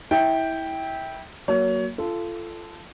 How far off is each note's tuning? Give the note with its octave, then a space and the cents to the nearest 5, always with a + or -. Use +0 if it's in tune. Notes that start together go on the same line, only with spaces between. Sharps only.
E4 -20 G5 +0
F#3 +5 A#3 +10 C#5 +30
F4 -25 A4 -5